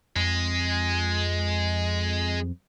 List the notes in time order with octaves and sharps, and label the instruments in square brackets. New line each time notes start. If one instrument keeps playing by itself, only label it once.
[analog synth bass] F2 [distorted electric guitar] G#3